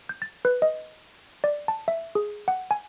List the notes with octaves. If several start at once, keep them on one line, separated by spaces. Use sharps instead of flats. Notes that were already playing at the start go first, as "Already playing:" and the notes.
G6
A6
B4
D#5
D5
A5
E5
G#4
F#5
G#5